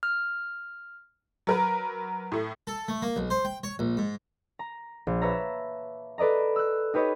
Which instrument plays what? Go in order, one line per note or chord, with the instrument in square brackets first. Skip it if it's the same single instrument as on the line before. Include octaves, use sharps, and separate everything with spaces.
[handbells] F6
[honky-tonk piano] F#3 A#4 B4
A2 A3
[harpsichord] A4
A3
A#3
B1
C5
G5
C#5
A#1
G#2
[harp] A#5
A#1
B4 C#5 E5 A5 A#5
A4 B4 D5 D#5 A#5
E6 F#6
D#4 G4 B4 C#5 D#5